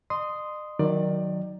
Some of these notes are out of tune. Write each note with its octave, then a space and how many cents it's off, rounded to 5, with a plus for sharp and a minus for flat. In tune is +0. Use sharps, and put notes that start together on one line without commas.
D#5 -45 C6 -10 D#6 +0
D#3 +0 F#3 +0 D5 +20